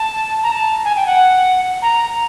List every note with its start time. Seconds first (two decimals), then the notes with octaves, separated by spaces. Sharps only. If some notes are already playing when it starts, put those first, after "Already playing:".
Already playing: A5
0.43 A#5
0.52 A5
0.85 G#5
0.96 G5
1.07 F#5
1.82 A#5